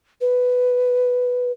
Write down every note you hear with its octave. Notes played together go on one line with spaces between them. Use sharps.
B4